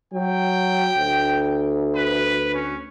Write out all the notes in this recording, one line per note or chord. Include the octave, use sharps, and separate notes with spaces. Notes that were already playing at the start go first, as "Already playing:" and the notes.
F#3 G5
D2
B4
C#4